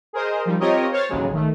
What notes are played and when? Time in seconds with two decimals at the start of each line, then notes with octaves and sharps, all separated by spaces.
0.13 G#4 A#4 C5 D#5
0.45 F3 G3 D#4
0.60 C4 F4 G4 A#4 C#5 D#5
0.91 C5 C#5 F6 A6
1.09 A1 D#2 C#3 F#3 G#3
1.33 D#3 A3